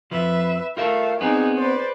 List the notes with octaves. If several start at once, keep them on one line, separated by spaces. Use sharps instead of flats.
F2 F3 B4 E5
A3 F4 A#4 E5 F5
B3 C4 D4 D#4 G#4
B4 C5 D5